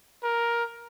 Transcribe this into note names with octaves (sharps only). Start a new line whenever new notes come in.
A#4